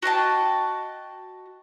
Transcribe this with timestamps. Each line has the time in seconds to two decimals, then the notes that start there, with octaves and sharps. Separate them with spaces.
0.02 F#4 D#5 G5 A5